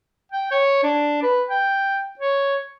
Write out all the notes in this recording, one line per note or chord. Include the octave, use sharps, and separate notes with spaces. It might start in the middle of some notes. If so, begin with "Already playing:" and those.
G5
C#5
D4
B4
G5
C#5